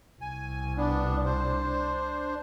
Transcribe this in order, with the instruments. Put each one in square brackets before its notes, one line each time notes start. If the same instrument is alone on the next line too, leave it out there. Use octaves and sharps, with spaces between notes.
[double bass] C2 [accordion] G#5
[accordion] B3 D4
D4 C5